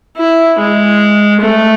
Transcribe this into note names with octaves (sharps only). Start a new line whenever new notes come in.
E4
G#3
A3